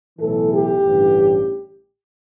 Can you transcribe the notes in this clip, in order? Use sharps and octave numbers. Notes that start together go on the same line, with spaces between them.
B1 A2 E3 A4
G4
A1 G2 D3